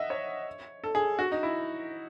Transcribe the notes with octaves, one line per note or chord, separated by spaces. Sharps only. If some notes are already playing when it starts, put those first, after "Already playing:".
Already playing: D#5 E5 F#5
C#5
A4
G#4
F#4
D#4
E4